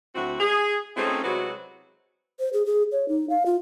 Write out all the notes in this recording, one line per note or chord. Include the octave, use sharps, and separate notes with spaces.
D2 C4 E4 F#4
G#4
A3 C4 C#4 D#4 F4 G#4
C3 F#3 G#3 E4 F#4 B4
C5
G#4
G#4
C#5
D#4
F5
F4